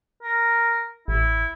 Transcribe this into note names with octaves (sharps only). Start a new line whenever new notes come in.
A#4
A1 E4